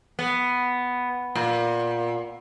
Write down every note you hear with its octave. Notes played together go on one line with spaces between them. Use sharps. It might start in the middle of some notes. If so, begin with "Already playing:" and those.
B3
A#2